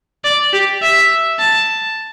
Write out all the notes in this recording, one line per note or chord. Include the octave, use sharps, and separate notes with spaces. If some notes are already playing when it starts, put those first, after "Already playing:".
D5
G4
E5
A5